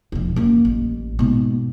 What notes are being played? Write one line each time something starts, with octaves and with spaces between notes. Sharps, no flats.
E1 F3
F#2 A#3
A1
G#2 B2